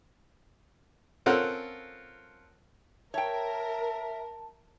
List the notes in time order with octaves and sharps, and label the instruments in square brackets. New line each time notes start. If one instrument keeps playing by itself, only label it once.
[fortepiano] C4 C#4 F4 A4 A#4 F#5
[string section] A#4 [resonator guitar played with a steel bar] C#5 G5 [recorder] E5 [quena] A5